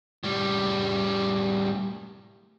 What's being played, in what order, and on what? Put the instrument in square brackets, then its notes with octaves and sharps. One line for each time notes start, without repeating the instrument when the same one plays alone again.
[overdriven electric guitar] A2 G3